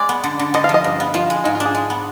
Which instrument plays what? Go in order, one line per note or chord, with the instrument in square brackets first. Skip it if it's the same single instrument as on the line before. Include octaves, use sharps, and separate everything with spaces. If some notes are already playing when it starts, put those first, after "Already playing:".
Already playing: [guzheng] G#3 [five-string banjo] D5
[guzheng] B3
D3
D3
[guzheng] D3 [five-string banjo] D#5
[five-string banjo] F5
[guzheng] F3
[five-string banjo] D#5
[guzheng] G2
B3
[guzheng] F3 [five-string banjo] F4
[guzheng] G#3
[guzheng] G#2 [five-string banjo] D#4
[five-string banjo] F4
[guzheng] D4
[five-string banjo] G#4
[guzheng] G#3
B3